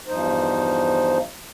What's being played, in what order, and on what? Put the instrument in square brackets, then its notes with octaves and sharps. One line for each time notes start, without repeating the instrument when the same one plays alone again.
[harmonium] E2 G2 F3 D#4 C5